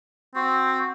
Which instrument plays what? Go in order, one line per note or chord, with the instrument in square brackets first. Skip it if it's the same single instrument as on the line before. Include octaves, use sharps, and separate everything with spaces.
[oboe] C4 [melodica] F#4